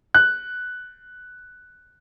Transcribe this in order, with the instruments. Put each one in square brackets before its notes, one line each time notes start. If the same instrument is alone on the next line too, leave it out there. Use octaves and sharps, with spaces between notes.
[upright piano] F#6